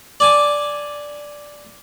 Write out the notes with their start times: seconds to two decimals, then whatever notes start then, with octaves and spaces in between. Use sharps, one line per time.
0.20 D5 G#5 A5